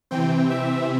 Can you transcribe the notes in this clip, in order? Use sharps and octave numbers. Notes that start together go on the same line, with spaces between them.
C3 E3 C4 G5
E5